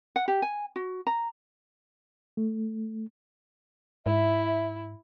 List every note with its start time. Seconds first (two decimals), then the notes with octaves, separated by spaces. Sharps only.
0.16 F#5
0.28 G4
0.42 G#5
0.76 F#4
1.07 A#5
2.37 A3
4.06 G#2 E4 E5